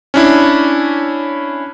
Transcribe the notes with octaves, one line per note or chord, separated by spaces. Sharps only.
C#4 D4 E4